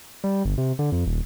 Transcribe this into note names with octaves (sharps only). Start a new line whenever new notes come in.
G3
G1
C3
D3
F2
D#1